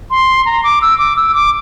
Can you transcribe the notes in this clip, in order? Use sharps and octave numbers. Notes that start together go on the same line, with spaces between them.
C6
A#5
D6
E6
D6
E6
D6